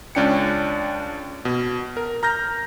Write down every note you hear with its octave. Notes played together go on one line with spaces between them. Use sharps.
C#2 C#4 D4 G5 C#7
B2
A#4
A#5 F6 G6 A#6